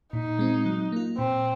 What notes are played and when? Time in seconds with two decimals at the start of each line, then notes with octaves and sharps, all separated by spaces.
0.13 A#2 D#4
0.39 G#3 C4
0.66 F#3
0.92 A#3 F4
1.19 A#2 C4